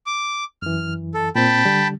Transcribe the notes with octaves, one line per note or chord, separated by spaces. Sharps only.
D6
F#2 E3 F6
A4
A#2 C4 G5 A5 B5
D3 G3